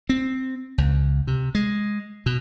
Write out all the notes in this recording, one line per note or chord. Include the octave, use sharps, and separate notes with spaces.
C4
C#2
C3
G#3
B2